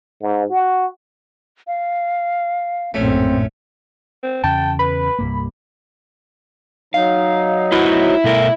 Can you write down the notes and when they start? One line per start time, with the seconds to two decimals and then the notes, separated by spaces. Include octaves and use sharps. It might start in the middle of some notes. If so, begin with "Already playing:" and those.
0.22 G#2
0.51 F#4
1.67 F5
2.94 A#1 F#2 A2 A3 C4 C#4
4.23 C4
4.44 E2 C#3 C#4 G5 A5
4.79 B4 B5
5.19 C2 G2 A#3
6.94 F#3 D#4 F5
7.72 E4 F#4 B4 C5
8.24 B2 A3 A#4